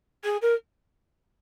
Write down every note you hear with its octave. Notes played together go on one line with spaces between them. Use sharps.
G#4
A#4